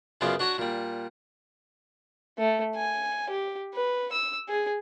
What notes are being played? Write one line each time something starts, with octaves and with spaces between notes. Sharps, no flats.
F#2 C#3 B3 F4 D5
D4 F#4 C#5 F#5 A#5
A#2 G3
A3
G#5
G4
B4
E6
G#4